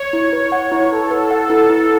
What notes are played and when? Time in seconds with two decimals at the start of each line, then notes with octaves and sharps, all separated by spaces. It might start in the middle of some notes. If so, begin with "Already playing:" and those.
Already playing: C#5
0.13 E4
0.33 B4
0.52 F#5
0.72 E4
0.91 E4 A4
1.11 B4
1.31 F#5
1.50 E4
1.69 E4